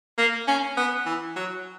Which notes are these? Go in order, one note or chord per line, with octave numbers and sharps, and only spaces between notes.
A#3
C#4
B3
E3
F#3